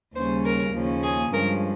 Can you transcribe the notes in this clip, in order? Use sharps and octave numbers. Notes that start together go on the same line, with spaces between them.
D#2 C#3 G3 C#4 C5
A#4
D#2 C#3 F3 A#3 C#4
G#4
G2 F3 G#3 C#4 A#4